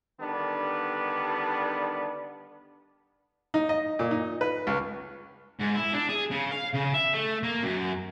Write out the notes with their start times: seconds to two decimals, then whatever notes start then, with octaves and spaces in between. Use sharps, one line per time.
0.21 D3 D#3 G3 B3 D4
3.54 D#4
3.69 D#5
3.99 A#2
4.11 D#4
4.41 B4
4.67 C#2
5.60 G#2
5.75 E4
5.94 D4
6.09 G#4
6.31 C#3
6.51 F5
6.73 C#3
6.94 E5
7.14 A3
7.43 A#3
7.63 F#2